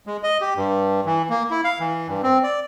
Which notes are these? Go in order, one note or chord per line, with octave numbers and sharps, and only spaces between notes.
G#3
D#5
G4
G2
E3
A#3
E4
F5
E3
G2
C4
D5